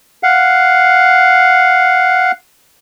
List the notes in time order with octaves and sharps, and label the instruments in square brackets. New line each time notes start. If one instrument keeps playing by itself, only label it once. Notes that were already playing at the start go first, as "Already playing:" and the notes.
[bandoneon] F5 F#5